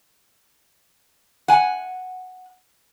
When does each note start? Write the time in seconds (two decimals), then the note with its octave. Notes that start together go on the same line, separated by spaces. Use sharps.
1.48 F#5 G#5